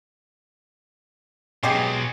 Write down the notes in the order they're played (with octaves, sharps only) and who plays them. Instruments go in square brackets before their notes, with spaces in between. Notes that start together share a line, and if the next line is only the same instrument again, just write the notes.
[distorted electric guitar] B2 F#3 [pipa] G#3 G4 G#4